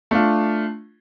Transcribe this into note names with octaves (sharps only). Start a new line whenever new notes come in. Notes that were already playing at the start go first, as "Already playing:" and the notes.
A3 D4 F4